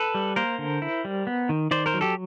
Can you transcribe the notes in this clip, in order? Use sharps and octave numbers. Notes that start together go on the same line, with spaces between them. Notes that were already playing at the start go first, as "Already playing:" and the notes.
Already playing: A4 B4
G3
A#3 A#4 C5
D3
E4
G3
B3
D#3
D#3 C5 D5
A#4 C5
F#3
G4 A4